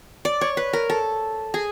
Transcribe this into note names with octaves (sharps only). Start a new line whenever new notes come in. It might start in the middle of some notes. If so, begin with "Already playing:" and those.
D5
C#5
B4
A#4
A4
G#4